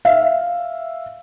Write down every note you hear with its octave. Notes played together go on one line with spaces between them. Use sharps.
E5 F5